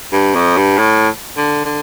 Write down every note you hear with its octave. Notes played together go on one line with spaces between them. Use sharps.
G2
F2
G2
A2
D3
D3